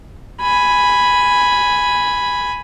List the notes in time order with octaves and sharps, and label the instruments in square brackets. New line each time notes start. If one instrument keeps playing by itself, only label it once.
[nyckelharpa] G#5 B5